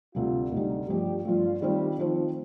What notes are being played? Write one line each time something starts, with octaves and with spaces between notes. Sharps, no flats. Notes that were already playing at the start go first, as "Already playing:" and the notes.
D2 C3 G3 F4
D2 C3 G3 D#4
G2 F3 A3 G4
G2 F3 A3 F4
D#3 G3 A3 C4 F4 C5
D#3 F3 A3 C4 F4 C5